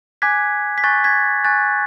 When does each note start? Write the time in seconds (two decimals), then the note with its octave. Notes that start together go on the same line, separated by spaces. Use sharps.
0.22 G#5 D6 F#6 G#6 B6
0.78 B6
0.83 G#5 C#6 F#6 A6
1.04 G#6 B6
1.44 G#5 C#6 F#6 A6